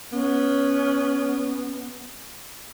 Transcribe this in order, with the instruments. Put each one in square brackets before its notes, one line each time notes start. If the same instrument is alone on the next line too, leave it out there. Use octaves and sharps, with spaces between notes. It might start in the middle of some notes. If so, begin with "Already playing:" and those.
[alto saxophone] B3 [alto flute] C#4